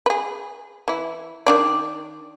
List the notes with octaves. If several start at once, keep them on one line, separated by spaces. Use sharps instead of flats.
G#4 B4
E3 E4
D#3 D4 D5